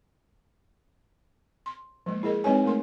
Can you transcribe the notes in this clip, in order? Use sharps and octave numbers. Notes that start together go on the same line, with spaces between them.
C6
F3 G#3 A#3
E4 G#4 A#4 D#5
G#3 C4 D#4 B4 C#5 G#5
A3 A#4 C6